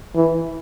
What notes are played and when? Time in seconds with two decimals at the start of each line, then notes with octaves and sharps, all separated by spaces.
0.15 E3